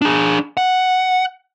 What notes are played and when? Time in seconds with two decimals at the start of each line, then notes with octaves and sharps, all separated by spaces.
0.02 D4 G#4
0.57 F#5